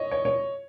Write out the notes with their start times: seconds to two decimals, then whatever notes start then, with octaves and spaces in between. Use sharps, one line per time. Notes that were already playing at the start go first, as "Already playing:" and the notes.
Already playing: C#5 D#5
0.11 C#5
0.25 C#5